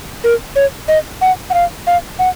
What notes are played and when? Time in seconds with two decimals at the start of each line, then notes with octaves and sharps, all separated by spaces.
0.24 A#4
0.56 C#5
0.88 D#5
1.21 F#5
1.50 F#5
1.54 F5
1.87 F5
2.19 F#5